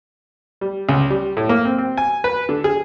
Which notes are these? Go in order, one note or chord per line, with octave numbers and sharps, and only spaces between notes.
G3
C#2
G3
A2
A#3
C4
C4
G#5
B4
D3
G#4